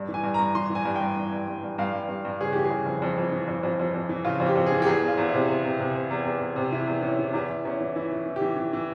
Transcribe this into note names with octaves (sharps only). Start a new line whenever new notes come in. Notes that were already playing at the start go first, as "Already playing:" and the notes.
Already playing: G2
E3
G#5
G2
G2 A#5
E3 C6
E3
G#5
G2
G2 G5
E3
G2
G2
G2
G2 F5
G2
G2
G2
C#3 G#4
E3 G4
G#4
C#3
F2
F2
F2
E3
F2
F2
F2
F2
E3
C#3 F4
F2
G4
F2
G#4
E3
G4
E2 G#4
E2
F4
E2
E4
C3
C3
C3
C3
C3
E2
E2
E2
C3
E3 E4
E2
E3 C#4
E3
E2 E4
E2
E2 C#4
E3
E3 E4
E3
E3
G4
E3
E3
E3